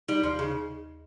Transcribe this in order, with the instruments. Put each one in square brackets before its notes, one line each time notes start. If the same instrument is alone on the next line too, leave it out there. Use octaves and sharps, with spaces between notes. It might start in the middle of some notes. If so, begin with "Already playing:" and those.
[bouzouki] G3 [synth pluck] D#4
[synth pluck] D#2 [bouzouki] F3
[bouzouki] C#3 [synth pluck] D#4